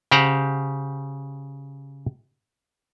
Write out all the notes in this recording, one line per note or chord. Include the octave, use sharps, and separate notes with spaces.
C#3 G4 C5 F#5 A#5